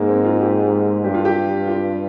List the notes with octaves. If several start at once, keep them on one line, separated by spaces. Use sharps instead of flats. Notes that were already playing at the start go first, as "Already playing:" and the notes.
Already playing: G#2 G#3 A#3
C4
F4
G4
G2 G4
F4
G4
F4